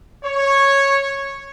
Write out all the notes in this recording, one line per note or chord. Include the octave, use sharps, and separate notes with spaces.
C#5